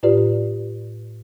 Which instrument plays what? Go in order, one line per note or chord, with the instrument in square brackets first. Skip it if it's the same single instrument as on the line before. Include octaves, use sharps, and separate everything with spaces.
[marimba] A2 F4 G4 B4 D5